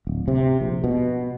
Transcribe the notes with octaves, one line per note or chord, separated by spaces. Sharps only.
D1
C3
A#1
B2